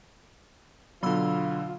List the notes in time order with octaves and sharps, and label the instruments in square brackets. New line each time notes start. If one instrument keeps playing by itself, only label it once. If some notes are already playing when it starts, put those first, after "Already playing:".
[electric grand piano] B2 D3 [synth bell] F#3 B5 E6 [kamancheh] F4